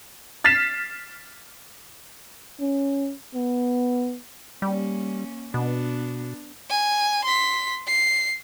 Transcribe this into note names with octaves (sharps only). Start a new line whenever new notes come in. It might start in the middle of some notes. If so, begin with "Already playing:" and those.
F6 A6 B6 C7 E7
C#4
B3
G3 A#3 C#4
B2 B3 D4
G#5
C6 B6
C7